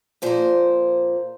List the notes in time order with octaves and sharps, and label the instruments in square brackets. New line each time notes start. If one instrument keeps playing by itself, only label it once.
[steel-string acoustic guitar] A#2 F3 A#3 C5